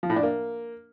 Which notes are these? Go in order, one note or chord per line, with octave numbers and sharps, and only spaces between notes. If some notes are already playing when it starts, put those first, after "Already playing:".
F3
A2
D4
A#3